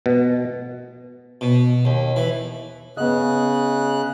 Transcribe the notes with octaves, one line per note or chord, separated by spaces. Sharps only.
B2
B2
D#2
E3
C#3 B3 D#5 F#6